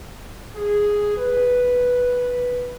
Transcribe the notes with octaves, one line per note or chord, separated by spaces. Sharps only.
G#4
B4